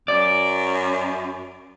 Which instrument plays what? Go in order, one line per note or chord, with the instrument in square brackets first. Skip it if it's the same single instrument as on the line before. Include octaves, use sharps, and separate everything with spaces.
[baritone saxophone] F#2 [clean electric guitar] D5